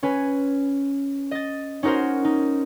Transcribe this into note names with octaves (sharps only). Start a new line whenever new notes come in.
C#4 B4 G#5
D#5 A6
C#4 D#4 F#4 A#4 C5
D#4